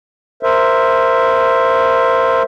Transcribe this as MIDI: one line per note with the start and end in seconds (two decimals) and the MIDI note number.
0.43 2.43 70
0.43 2.43 72
0.43 2.43 76